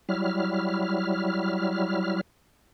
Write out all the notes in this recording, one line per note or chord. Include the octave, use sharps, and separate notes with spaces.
F#3 G3 E4 F6